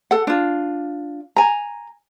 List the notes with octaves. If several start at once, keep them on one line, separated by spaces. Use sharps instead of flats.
A4 F#5
D4 F4
G#5 A#5